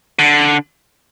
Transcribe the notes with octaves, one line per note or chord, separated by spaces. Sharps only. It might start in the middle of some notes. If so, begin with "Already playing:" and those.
D3